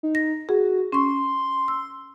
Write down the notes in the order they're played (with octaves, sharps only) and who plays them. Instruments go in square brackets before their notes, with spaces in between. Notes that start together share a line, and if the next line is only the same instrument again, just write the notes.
[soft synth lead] D#4
[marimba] A#6
[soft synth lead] F#4 [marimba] G#4
[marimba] C#4 C#6 [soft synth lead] C6
[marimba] E6